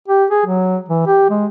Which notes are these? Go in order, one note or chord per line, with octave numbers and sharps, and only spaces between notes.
G4
G#4
F#3
E3
G4
G#3